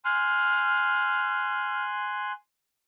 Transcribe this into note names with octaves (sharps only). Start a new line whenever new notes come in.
G#5 C6 F6 F#6